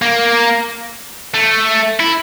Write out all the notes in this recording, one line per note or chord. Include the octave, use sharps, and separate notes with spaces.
A#3
A3
E4